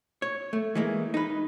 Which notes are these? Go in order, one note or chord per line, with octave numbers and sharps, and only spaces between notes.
C#5
A3
E3 G#3 A#3
D#4 B4